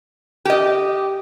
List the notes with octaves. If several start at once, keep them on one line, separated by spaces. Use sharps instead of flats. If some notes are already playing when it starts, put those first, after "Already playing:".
G4 D#5